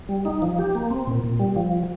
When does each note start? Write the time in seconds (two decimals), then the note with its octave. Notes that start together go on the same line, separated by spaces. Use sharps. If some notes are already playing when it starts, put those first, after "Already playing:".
0.09 G3
0.25 D#4
0.42 F3
0.59 G4
0.75 A#3
0.91 C4
1.07 A#2
1.23 A#2
1.39 G3
1.56 F3